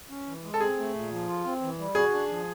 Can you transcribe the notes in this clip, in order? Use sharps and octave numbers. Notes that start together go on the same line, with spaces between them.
C#4
E3
G#3
A4
C4 G#4
A3
A#2
F3
F4
C4
E3
G3
F#4 G#4
D4
F3